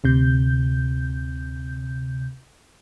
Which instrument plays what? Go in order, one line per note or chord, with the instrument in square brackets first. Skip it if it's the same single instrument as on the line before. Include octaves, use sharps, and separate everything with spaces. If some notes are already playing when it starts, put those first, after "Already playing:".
[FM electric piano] D2 C3 G6